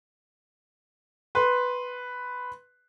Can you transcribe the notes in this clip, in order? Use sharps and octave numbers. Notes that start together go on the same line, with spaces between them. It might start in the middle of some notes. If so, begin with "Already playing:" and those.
B4 C6